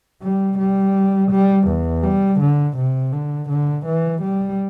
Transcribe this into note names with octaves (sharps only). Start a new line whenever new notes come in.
G3
G3
G3
E2
G3
D3
C3
D3
D3
E3
G3